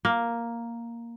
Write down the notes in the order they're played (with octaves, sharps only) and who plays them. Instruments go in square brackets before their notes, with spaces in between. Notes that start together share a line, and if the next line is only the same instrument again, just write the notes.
[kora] A#3